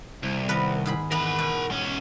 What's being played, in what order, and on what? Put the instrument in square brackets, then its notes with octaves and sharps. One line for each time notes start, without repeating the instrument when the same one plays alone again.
[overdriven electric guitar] C2
[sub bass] D#3 [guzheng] B3 A#4 B4
[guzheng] G#2 G#4 B5
[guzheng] E3 B3 [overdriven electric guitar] A#4 B5
[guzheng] B2
[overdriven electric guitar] G#2 C#4